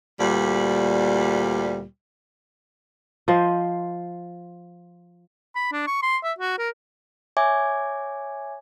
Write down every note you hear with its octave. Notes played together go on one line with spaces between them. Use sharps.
D2 A#2 G3
F3 C5 D#5
B5
D4
C#6
C6
E5
F#4
A#4
C#5 E5 G#5 D6 G#6